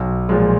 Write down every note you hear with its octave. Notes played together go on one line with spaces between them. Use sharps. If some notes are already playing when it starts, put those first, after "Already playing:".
Already playing: B1
A#2 F3 G#3